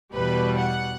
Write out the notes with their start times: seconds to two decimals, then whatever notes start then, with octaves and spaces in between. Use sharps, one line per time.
0.13 E2 B2 G3 B4
0.60 F#5